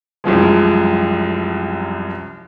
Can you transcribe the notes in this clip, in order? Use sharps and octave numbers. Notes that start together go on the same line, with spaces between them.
C2 F#2 F3 G#3